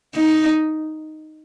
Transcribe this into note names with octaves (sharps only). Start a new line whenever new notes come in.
D#4